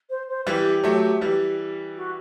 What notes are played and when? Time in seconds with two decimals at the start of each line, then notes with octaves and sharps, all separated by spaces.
0.10 C5
0.28 C5
0.47 E3 G3 G4
0.84 F#3 A3
1.21 E3 G3
1.96 F#4